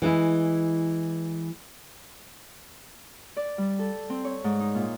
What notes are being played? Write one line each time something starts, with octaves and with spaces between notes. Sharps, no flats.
E3 G#3 E4
D5
G3
A4
C4
C#5
G#2
D#4
A#2